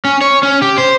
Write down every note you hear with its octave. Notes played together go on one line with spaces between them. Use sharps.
C#4
C#5
C#4
G4
C5